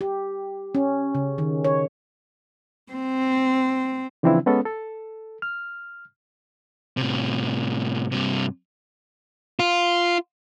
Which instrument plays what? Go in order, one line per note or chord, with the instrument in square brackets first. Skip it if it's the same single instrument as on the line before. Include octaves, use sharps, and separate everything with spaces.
[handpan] G4
C#4
C#3
D#3
C#5
[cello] C4
[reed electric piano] C#3 E3 F3 C4 D4 E4
G#3 B3 C#4 A4
A4
F6
[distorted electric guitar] A2 C3
G2 C3
F4